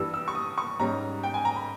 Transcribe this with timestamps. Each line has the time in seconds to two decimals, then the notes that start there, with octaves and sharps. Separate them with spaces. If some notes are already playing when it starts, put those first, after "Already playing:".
Already playing: G2 E3 G3 E6
0.14 E6
0.28 C#6
0.35 D#6
0.58 C#6
0.79 G#2 G3 C#4 A#5
1.23 G5
1.34 G#5
1.45 A#5
1.56 B5